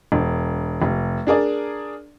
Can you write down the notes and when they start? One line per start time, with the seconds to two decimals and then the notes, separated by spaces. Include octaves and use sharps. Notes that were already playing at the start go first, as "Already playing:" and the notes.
0.12 E1
0.82 F1
1.27 D4 G#4 A#4 D5